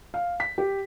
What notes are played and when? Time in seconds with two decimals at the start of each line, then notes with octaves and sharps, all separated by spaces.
0.14 F5
0.40 B6
0.58 G4